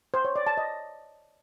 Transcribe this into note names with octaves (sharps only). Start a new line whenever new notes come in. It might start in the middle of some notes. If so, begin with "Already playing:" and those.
C5
C#5
D5
A5
D#5